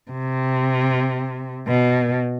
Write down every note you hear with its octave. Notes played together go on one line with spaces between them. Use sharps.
C3
B2